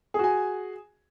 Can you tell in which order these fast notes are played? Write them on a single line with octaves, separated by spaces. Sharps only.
G#4 F#4 G#5